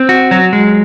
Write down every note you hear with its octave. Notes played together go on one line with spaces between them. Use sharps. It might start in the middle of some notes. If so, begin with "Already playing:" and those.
Already playing: C4
F#4
F#3
G#3